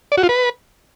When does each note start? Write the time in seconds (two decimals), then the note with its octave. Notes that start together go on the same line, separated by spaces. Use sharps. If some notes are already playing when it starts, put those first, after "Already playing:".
0.12 D5
0.18 F#4
0.23 F4
0.29 B4